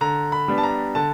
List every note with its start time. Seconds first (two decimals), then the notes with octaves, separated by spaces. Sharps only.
0.01 D3 A#5
0.32 B5
0.48 G3 B3 D4
0.58 A5
0.63 A#5
0.95 D3 A5